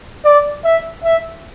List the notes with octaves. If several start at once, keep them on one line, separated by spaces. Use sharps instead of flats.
D5
E5
E5